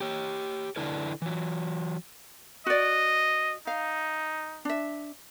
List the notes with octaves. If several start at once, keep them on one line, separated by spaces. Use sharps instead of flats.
G4 C#5
D3 D4 E4 A4 B4
E3 F#3
F#4 D5 D#5
D#4 F5
D4 E5